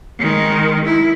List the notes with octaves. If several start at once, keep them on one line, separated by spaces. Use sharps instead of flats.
D#3 G#3
E4